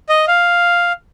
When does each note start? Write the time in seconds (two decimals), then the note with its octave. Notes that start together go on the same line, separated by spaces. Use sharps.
0.09 D#5
0.28 F5